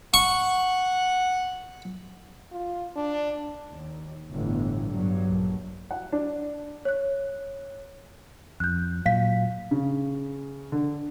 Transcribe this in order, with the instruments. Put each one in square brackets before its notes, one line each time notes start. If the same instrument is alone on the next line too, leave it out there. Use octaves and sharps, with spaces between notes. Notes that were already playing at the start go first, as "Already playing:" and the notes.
[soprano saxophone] F#5 [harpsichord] C#6
[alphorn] F4
D4
[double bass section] D#2
G1 A2 E3
G2 F#3
A#1
[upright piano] F#5
D4
[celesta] C#5 F#6
[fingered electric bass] F2 [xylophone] F#6 G6
[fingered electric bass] A#2 F#3 [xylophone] F5 B6
[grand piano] C#3
D3